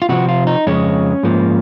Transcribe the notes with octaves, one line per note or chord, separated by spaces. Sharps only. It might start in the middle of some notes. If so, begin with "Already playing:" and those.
F4
C3 F3 C4 F#4
F4
D#4
F2 C#3 G#3 C#4
G#2 F3 A#3